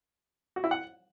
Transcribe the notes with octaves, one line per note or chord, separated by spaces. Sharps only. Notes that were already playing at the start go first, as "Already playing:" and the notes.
F#4
E4
F#5